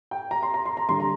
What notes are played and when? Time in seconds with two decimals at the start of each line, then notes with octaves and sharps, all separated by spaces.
0.11 G5
0.31 A#5
0.43 C6
0.54 A#5
0.66 C6
0.77 A#5
0.89 D3 G3 C6
1.00 A#5